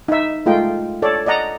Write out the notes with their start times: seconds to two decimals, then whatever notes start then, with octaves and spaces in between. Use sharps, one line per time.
0.08 D#4 E5
0.46 G#3 A3 F4 D#5 G5
1.02 A4 C#5 D5
1.26 D5 D#5 F#5 A#5